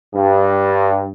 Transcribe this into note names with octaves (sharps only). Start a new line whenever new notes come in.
G2